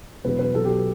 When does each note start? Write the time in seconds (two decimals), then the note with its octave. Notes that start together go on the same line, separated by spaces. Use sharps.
0.24 E1 E2 B2 F#3 B3 B4
0.39 B4
0.54 B1 B2 F#3 B3 A4
0.65 G4